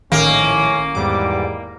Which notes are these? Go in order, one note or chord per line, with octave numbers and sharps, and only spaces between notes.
A#1 A2 D#3 A#3 C#4
E2 G#2 G3 D6